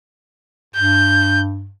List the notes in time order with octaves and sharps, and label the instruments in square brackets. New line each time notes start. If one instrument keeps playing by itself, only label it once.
[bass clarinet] G2 [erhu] G6